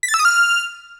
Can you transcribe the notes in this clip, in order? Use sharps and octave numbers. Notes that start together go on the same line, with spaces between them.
B6
A6
E6
D#6
F6